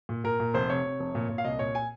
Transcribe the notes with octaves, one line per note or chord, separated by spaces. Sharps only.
A#2
A#2 A#4
A#2
F1 C5
C3 C#5
C3
F1
A#2
A#2
F5
C2 D#5
A#2 C#5
G#5